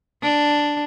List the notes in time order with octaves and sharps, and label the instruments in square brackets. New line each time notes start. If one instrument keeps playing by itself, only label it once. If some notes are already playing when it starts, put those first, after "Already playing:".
[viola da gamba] D4